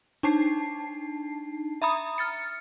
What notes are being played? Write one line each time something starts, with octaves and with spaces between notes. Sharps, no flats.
D4 D#4 A5 C7
E5 A#5 B5 D#6
F6 A6 C#7